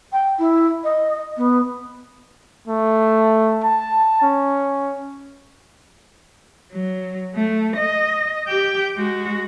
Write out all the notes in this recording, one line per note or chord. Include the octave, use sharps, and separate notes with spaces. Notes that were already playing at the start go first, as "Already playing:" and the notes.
G5
E4
D#5
B3
A3
A5
C#4
F#3
A3
D#5
G4 G5
G#3 F#4